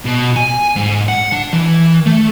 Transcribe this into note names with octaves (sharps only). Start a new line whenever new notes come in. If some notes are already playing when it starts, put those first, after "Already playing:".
B2
G#5
G#2
F#5
D4
E3
A3